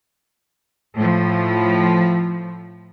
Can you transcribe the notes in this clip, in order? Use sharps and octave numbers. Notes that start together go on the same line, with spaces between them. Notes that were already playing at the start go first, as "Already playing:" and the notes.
A2 F3